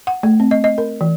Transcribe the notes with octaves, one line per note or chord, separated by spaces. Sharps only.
F#5
A3
C4
D#5
D#5
A#4
E3